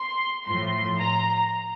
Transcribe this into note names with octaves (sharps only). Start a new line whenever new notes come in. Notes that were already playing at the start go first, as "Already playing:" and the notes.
Already playing: C6
A2 F3 C6
A#5